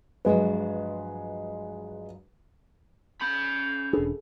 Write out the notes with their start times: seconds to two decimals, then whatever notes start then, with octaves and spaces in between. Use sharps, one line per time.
0.25 G2 F3 F#3 G#3 B4
3.21 C#4 B5 G6
3.93 E1 D4 G#4 A4 B4